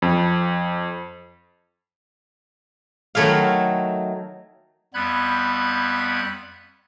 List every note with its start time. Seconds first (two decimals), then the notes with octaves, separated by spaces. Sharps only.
0.02 F2
3.15 D#3 F#3 A3 E4 F5
4.94 F2 G3 B3 B5 F#6 G#6